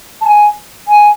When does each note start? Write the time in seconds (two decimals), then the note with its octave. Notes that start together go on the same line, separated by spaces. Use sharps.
0.21 A5
0.25 G#5
0.88 G#5